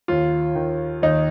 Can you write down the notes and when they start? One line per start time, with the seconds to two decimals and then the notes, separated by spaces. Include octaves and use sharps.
0.08 D#2 F4
0.55 D#3
1.02 D#2 D#4